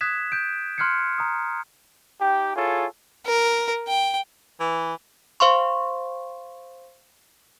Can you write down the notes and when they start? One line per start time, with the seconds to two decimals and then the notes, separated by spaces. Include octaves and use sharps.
0.01 D#6 F#6 G#6 B6 E7
0.32 G6 D7
0.78 C6 F6 F#6 G#6 C7 C#7
1.18 A#5 D#6
2.21 D#4 G4 G5
2.56 E4 F4 G#4 A4 C#5
3.26 A#4
3.88 G5
4.60 E3
5.40 C5 F5 C6 C#6